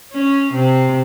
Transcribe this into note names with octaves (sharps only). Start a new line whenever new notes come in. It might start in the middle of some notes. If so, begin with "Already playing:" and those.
C#4
C3